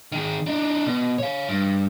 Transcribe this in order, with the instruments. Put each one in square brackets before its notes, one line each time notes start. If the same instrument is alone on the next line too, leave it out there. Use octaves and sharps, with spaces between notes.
[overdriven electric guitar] D#3 G#4
D4 D#4
B2
C#5 F5
G2